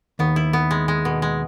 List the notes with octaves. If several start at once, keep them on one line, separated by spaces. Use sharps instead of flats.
D#2 D#3 B3
E4
B3
G#3
G#3
B2
G#3